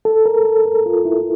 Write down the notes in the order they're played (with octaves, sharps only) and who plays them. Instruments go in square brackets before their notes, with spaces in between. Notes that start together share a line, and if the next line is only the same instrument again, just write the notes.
[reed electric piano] A4
A#4
A4
A#4
F4
E4